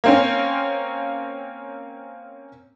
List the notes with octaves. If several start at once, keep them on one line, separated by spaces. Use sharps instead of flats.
A#3 C4 C#4